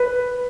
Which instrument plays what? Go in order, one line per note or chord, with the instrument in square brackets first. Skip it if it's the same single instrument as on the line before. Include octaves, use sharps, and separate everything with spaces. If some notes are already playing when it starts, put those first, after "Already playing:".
Already playing: [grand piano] B4